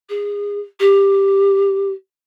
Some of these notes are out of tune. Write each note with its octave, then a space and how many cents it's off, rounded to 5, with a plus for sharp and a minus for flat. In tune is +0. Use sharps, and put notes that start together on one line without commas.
G#4 -25
G4 +5